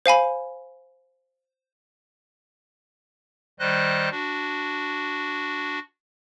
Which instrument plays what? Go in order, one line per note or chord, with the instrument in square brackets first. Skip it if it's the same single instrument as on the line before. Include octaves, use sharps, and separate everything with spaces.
[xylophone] C5 F5 G#5 B5
[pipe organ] D#3 G3 C5 D#5 F#6
D4 F#4